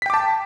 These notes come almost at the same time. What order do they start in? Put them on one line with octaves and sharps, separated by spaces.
B6 G5 D6 A5